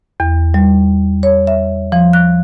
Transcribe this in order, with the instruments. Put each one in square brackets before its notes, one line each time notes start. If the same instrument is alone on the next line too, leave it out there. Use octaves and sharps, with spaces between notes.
[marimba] E2
G3
C#5
E5
F3
F#6